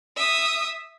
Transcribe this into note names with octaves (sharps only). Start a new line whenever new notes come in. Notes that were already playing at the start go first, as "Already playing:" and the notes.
E5 D#6